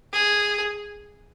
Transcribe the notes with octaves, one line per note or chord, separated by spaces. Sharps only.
G#4